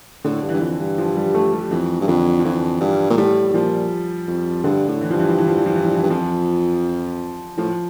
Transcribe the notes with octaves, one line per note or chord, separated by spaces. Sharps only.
A2 D3
G2
E3
G2
F2
G2
F3
G3
A3
G3
F2 E3
G2
F2 D3
F3
F2 E3
G2 G3
A#2
A2 G3
A2
A#2 F3
F2
G2 D3
A2
E3
G2 F3
E3
F3
E3
F3
E3
F3
E3
F3
E3
G2
F2 F3
A2 F3